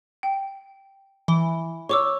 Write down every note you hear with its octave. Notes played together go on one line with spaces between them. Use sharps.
G5
E3
C#5 C#6 D6 E6